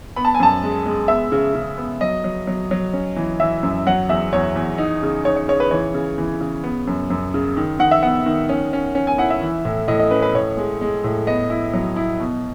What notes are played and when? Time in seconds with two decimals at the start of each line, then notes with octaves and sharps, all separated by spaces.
0.16 B3 B5
0.25 A5
0.34 G#5
0.40 F#2 A5
0.63 G#3
0.86 G#3
1.08 B3 E5
1.32 C#3
1.55 C#3
1.78 B3
2.01 F#3 D#5
2.24 F#3
2.47 F#3
2.71 F#3
2.93 C#4
3.16 E3
3.40 E3 E5
3.63 F#2
3.87 F#3 F#5
4.09 E2 E5
4.33 E2 C#5
4.56 E2
4.78 D#4
5.03 C#3
5.25 D#4 C#5
5.36 C#5
5.48 C#3 C#5
5.60 B4
5.71 E3 C#5
5.94 C#3
6.18 E3
6.41 C#3
6.63 B3
6.87 F#2
7.10 F#2
7.34 C#3
7.57 D#3
7.79 D#3 F#5
7.91 E5
8.02 B3 F#5
8.26 D#3
8.49 C#4
8.73 C#4
8.95 C#4
9.07 G#5
9.18 E4 F#5
9.30 E5
9.41 E3
9.65 A2
9.88 A2 D#5
9.99 D#5
10.11 C#4 B4
10.22 B4
10.34 A2 C#5
10.57 G#3
10.81 G#3
11.04 A2
11.27 B3 D#5
11.50 E4
11.73 F#3
11.96 E4
12.20 B2